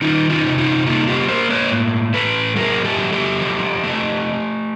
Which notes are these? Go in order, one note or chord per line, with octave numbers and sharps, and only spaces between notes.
D#3 D#4 F4
D#4 F4
C3
D#4 F4
A#3 D#4 F4
F4 G4
A#3 A#4 C5
B4 C#5
A2
A2 A4 B4
F#3 G#4 A#4
G4 A4
F#3
G4 A4
F3
A3